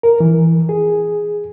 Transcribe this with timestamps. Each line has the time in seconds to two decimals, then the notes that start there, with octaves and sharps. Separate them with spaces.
0.03 A#4
0.20 E3
0.69 G#4